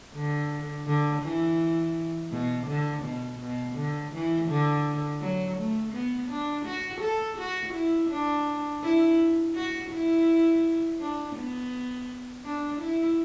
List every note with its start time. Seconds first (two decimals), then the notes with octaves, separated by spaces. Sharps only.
0.14 D3
0.86 D3
1.22 E3
2.31 B2
2.67 D3
3.03 B2
3.39 B2
3.76 D3
4.12 E3
4.49 D3
5.21 F#3
5.57 A3
5.93 B3
6.29 D4
6.65 F#4
7.01 A4
7.38 F#4
7.74 E4
8.10 D4
8.83 E4
9.55 F#4
9.91 E4
11.00 D4
11.36 B3
12.44 D4
12.81 E4